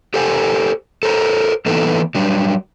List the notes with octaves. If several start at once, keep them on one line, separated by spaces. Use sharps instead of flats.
G4 A4 C5 G#5
A4 A#4 C5
E3 A#3 B3 D#4 A4 B4
F#3 G3 D4